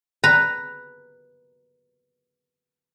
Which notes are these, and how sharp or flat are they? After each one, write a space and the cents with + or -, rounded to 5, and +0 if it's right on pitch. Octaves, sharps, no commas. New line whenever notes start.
B4 +0 A#5 +0